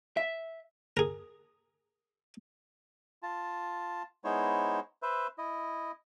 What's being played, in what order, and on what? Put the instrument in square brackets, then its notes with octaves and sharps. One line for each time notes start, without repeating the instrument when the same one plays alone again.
[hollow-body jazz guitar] E5
[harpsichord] G#4 A#4
[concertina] F4 A5
G#3 B3 D#4 E4 C5 C#5
B4 C5 E5
E4 D#5